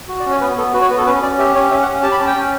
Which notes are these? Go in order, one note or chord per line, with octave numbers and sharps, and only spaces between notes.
F#4
D5
C#4
C#5
B3 B4
B3 A4
F#4 B4
C#5
B3 B4
A4
C#4 B4
C#4 D5
G4 E5
C#4 C#5
C#4 E5
F#5
C#4
G4 A5
B5
C#4 A5
G5
C#4